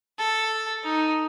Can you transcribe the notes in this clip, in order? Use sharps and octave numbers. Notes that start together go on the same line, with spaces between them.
A4
D#4